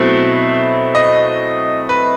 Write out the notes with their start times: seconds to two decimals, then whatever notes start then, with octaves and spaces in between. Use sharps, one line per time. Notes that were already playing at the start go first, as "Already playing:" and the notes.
Already playing: B2 F#3 A3 C4 E4
0.95 D#5
1.89 B4